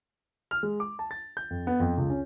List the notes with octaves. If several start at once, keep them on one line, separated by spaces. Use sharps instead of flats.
F6
G#3
D6
A5
A6
G6
F2
B3
F2
C#2
C#4